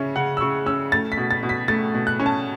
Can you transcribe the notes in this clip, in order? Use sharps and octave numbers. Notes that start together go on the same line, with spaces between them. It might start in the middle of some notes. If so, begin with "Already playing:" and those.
Already playing: C#3 C#4 E5
C#3 F#5
E6
C#3 C#6
C#4 E6
A3 A6
B6
B2
A6
B2
B6
A3 A6
B2
F#6
C#4
A5